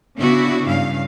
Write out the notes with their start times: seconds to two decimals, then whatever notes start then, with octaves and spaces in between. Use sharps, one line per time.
0.18 C#3 B3 D4 E4 F#4
0.68 G2 C#3 F5